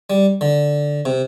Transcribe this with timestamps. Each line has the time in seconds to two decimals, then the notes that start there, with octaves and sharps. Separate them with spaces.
0.10 G3
0.41 D3
1.05 C3